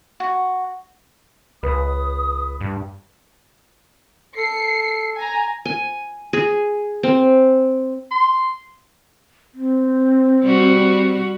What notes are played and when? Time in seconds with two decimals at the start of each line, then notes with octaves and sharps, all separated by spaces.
0.20 F#4
1.63 C#2 B4 D#6
2.61 G2
4.37 A4 C7 C#7
5.17 G#5 A#5
5.65 G#5
6.33 G#4
7.03 C4
8.11 C6
9.54 C4
10.43 G3 F#4